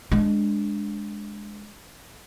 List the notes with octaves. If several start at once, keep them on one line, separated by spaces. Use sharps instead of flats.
G#3 D4